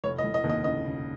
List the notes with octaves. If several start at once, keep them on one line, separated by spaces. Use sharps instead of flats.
F1 C#5
D#5
F1
D#5
D#2
D#5
C#3 D#5
C#3